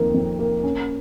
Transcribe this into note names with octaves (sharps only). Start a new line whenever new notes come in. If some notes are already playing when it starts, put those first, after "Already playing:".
Already playing: F2 D#3 A#3
F2
A#3
C#4